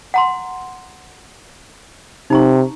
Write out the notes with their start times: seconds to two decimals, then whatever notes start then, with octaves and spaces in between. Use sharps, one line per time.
0.14 F#5 A#5 C6
2.30 C3 D#4 A#5 C#6